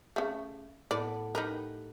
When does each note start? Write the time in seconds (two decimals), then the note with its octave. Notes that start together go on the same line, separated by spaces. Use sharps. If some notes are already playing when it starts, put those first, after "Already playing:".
0.16 C#3 A3
0.91 A2 B3 D5
1.35 D#4 G4 A#4 B4